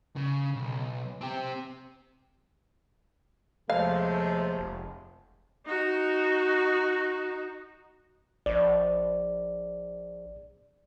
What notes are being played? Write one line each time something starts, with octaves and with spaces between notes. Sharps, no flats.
C#3
B1
C4 G4
D#2 C3 F3 G#3 A3 F5
F1
D#4 F#4
A#1 D5